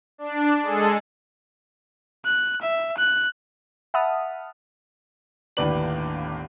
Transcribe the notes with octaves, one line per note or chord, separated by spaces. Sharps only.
D4
G#3 G#4 A4
F#6
E5
F#6
E5 F#5 A5 B5 D#6 F6
G1 D#2 A2 B4 D5 F#7